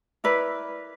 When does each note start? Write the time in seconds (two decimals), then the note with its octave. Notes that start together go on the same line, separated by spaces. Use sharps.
0.24 E4 A#4 B4 D5